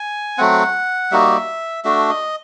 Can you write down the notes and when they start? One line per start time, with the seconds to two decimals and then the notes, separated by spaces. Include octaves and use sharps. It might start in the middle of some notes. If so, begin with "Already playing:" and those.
Already playing: G#5
0.38 F#3 A3 C4 F#5
1.11 G3 A#3 D#4 F#4 E5
1.84 A3 D4 F#4 E5
2.10 D#5